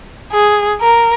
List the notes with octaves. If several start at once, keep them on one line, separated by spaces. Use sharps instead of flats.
G#4
A#4